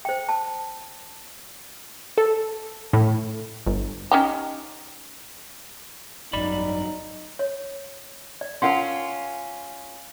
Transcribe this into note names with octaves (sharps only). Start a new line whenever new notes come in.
C5 G5
A5
A4
A2
G1
C#4 D#4 G4
G#1 F#2 D#4 D5 B5
C#5
D5
C#4 F4 A#4 F#5 C6